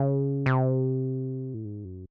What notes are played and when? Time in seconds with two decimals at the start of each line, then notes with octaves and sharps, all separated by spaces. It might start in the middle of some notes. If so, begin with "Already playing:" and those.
Already playing: C#3
0.46 C3
1.54 A2
1.65 G#2
1.85 F#2